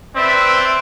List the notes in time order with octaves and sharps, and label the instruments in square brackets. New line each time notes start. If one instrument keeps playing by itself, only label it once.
[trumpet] C4 [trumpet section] B4 D5 E5